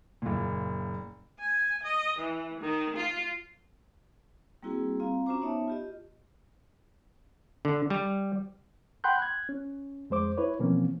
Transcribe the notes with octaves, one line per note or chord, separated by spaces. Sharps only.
F#1 A#2
G#5
D#5
E3
D#3
F4
G3 A#3 C4 E4 F#4 G#4
C4 F4 F5 A#5
C#4 F4 F#4 C5 A#5 D6
B3 D#4 C#5 E5 A5
F4 G4 D#5
D3
G3
F#5 G5 B5 C6 F#6 G6
F#6 G#6
C#4
F2 G#3 C5 D6
E4 B4 C#5
B2 E3 F3 A#3 C4 C#4